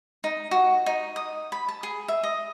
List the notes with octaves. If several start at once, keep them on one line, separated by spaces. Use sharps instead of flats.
D#4
F#4
D#4
D#6
B5
A5
G#4
E5
D#5